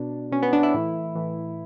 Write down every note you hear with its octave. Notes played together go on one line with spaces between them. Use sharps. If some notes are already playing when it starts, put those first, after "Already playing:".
Already playing: B2 D4
B2 C#4
B3
D4
E4
A2 E3
A2 E3